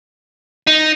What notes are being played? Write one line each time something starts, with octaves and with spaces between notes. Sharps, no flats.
D#4